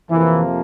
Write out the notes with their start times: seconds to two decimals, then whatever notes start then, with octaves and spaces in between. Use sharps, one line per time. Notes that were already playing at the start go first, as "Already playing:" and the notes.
0.11 F2 C3 E3 F3 A#3